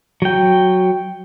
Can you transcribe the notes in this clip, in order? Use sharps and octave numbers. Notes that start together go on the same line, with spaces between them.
F#3 G5